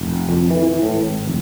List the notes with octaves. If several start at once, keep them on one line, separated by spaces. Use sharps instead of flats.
F1
F2
E3
E3
A2
G#1
F1